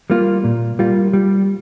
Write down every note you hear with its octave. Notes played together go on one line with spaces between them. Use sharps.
G3 A#3 F4
A#2
G3 A#3 F4
G3